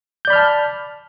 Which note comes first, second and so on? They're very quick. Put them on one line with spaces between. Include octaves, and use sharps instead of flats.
G6 D5 B5 F6 A5